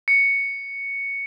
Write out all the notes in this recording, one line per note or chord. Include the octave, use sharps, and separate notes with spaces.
C#7